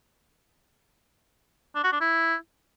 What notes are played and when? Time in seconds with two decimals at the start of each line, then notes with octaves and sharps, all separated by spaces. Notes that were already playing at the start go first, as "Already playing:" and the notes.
1.75 D4
1.84 F#4
1.92 D4
2.01 E4